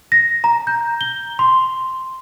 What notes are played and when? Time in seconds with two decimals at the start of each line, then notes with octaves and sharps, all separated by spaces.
0.12 A#6
0.44 A#5
0.67 G6
1.01 G7
1.39 C6